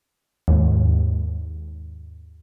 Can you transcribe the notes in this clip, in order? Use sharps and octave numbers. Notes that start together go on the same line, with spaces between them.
D#2 G#2